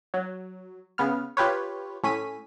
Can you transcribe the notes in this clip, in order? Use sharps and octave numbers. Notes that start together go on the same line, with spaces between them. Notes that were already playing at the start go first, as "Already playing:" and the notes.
F#3
C#3 B3 F6
F4 G4 B4 C#5
A2 C#4 B6 D#7